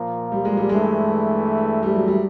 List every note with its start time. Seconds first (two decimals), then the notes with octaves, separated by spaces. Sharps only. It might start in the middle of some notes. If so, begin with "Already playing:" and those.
Already playing: A#2 F3 A#3
0.32 G3
0.45 G#3
0.57 G3
0.69 G2 E3 G#3 A3
1.83 G3
1.95 F#3
2.08 G3